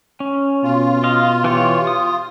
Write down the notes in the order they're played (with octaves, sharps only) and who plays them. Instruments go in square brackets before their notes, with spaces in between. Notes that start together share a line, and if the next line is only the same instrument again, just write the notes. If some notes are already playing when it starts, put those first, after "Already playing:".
[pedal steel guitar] C#4
[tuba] B2 [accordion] F4
[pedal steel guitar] D#5 F5
E3 G4 C#5
D#6